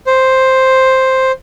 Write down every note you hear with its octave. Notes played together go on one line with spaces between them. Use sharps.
C5